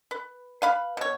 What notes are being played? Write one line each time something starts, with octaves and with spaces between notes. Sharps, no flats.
B4
B4 F5 B5
B2 C#5